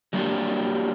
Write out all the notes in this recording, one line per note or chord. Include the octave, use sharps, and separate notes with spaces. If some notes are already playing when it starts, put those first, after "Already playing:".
F#3 G3 A3 A#3 D4 G4